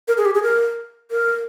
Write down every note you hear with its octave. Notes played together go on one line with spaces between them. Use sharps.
A#4
G#4
G4
G#4
A#4
A#4